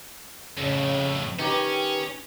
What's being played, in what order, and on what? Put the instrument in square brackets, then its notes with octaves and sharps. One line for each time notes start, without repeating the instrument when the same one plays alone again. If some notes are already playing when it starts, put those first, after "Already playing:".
[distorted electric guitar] F2 A2 [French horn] C#3
[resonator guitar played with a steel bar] D#3 G4 [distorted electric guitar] C#4 [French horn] B4